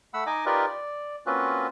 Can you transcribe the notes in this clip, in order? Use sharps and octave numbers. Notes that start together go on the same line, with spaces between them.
A3 F#5 B5 E6
D#4 D#5 G#5 D6
D#4 F4 G4 A#4 B4 D5
D5
A#3 C4 C#4 F4 F#4 B4